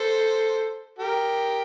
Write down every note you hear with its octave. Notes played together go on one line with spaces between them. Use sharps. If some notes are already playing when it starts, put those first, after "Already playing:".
Already playing: A4 C5
G4 A#4